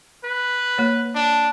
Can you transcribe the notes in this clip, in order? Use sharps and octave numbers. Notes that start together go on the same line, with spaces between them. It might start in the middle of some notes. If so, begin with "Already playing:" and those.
B4
A#3 C#5
D4